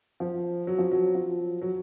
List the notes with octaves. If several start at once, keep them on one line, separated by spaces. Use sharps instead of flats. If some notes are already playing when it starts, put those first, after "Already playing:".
F3
F#3
F3
F#3
F3
F#3